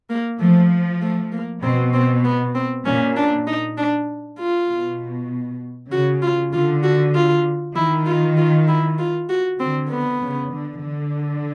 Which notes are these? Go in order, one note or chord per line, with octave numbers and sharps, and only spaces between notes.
A#3
F3 A3
A3
A#3
B2 C4
C4
B3
C4
A#2 C#4
D4
D#4
D4
F4
B2
C#3 F#4
F4
D3 F4
F#4
F4
D#3 E4
F4
F4
E4
F4
F#4
D3 C4
B3
C#3
D3
D3